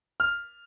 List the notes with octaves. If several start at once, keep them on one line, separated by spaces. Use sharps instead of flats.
F6